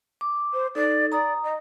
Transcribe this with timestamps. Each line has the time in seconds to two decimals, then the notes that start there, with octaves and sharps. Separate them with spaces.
0.21 D6
0.53 C5
0.75 D#4 A4 D5
1.12 D5 A#5 D#6
1.43 D#5